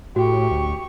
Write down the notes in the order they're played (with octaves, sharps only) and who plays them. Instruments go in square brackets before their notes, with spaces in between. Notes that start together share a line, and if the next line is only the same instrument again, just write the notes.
[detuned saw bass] A2 [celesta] F#4 [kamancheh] G4 C#6
[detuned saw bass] D2